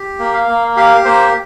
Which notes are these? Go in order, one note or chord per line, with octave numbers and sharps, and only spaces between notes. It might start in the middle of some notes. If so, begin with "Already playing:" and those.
Already playing: G4
A#3
F5
A#3
G4 F5
A#3 C5